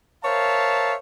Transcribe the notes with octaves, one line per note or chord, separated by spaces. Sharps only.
A#4 C5 C#5 E5 F5 A5